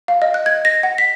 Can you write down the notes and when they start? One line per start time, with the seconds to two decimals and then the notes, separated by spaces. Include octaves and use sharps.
0.08 F5
0.22 D#5
0.34 F#6
0.46 G#6
0.65 A#6
0.83 F#5
0.98 B6